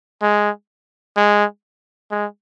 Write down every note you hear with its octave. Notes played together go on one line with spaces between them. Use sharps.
G#3
G#3
G#3